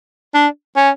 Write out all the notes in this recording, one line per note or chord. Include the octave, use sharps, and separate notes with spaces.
D4
C#4